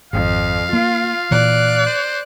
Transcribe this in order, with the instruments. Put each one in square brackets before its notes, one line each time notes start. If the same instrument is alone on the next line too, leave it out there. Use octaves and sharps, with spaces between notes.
[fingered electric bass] G#1 [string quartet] F2 [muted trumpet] F5
[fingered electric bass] A#3 [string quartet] F4
[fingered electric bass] A#2 E3 [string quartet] D5 F#6
[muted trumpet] C5